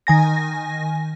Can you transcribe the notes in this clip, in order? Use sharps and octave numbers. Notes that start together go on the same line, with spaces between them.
D#3 G#5 A#6